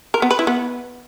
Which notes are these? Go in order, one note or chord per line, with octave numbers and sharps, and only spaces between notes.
A#4
B3
B4
E4
B3